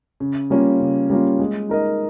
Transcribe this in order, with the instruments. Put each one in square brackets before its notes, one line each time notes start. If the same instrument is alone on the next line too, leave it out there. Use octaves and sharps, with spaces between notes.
[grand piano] C#3
G3 A#3 C#4 F4
C#3
G3 A#3 C#4 F4
G#3
D#4 A#4 D#5